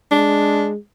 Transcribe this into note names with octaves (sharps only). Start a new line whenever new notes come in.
G#3 D4